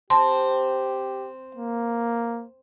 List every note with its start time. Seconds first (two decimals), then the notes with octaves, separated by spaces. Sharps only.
0.10 C4 G4 A5 C6
1.56 A#3